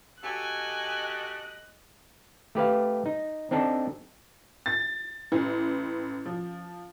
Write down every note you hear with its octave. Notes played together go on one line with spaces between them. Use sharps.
F#4 G4 A4 D#5 G#5 F#6
A3 G4 B4 F5
D#4
C4 D4 D#4 A4
A6
A1
F3